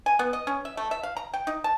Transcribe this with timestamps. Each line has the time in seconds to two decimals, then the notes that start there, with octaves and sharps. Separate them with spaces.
0.06 G#5
0.19 B3
0.33 D#5
0.47 C#4
0.65 E5
0.77 A3
0.91 E5
1.03 F5
1.17 A#5
1.34 G5
1.47 D#4
1.64 A5